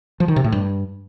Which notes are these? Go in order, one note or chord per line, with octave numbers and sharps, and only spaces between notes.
F3
D#3
C3
A2
G2